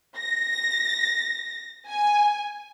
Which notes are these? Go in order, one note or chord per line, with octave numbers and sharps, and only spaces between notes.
A#6
G#5